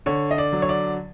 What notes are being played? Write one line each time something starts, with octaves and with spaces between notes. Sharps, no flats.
D3 C#5
D#5
D5
F#3
C#5
D5